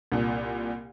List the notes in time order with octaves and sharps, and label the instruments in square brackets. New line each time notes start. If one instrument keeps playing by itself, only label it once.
[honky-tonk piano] C2 A#2